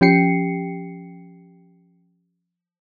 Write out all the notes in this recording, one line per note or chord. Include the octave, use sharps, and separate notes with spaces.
F3 C#4 G4 G5 C7 C#7